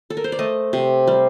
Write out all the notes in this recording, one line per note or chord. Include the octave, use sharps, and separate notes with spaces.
A4
A#4
C5
D5
A3 D#5
C3
G3